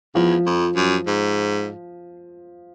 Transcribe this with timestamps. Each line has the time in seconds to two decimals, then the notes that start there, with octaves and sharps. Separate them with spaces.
0.15 E2 F3
0.46 F2
0.76 F#2
1.07 G#2